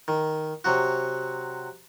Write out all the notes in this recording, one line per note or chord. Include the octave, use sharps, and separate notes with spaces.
D#3
C3 F#3 F#4